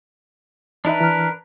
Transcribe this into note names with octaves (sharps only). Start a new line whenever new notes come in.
E3 D4 D#4 A#4 B4 E5
E3 A#5 F6